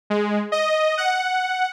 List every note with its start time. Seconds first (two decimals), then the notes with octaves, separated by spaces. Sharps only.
0.10 G#3
0.52 D#5
0.97 F#5